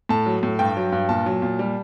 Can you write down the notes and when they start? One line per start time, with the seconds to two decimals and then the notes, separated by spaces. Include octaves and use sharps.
0.09 A2 A5
0.26 F#3
0.43 A2
0.59 G2 G5
0.77 F#3
0.92 G2
1.09 A#2 A5
1.26 F#3
1.42 A#2
1.59 G3